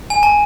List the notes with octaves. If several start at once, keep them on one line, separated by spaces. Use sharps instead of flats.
G#5
A5